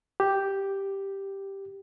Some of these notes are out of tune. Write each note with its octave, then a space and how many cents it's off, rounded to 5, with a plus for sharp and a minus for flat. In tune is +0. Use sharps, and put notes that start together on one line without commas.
G4 +0